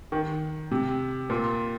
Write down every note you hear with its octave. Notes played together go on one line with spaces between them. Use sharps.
D#3
C3
A#2